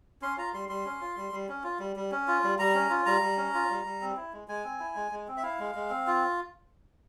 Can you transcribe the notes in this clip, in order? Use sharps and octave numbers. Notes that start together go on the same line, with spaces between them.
C#4 C6
F4 A#5
G3 C6
G3 C6
C#4
F4
G3
G3
C#4
F4
G3
G3
C#4
F4
G3
G3 A#5
C#4
F4
G3 A#5
G3
C#4
F4
G3
G3
C4
E4
G#3
G#3 G#5
C4
E4
G#3
G#3
C4
E5
E4 F5
G#3
G#3
C4
F4